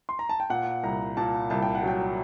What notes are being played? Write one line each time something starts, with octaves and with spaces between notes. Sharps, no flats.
C6
A#5
A5
G5
A#2 F#5
C2 A#5
A#2 A5
C2 A5
G5
F#5
F#3 G5